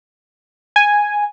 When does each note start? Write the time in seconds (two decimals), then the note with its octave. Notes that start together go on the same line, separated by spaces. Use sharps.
0.76 G#5